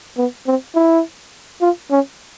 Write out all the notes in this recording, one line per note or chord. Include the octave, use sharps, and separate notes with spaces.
B3
C4
E4
F4
C#4